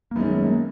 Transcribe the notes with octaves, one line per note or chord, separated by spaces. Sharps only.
A#3
F#2 D#3 G#3 B3 C#4
A3
A#3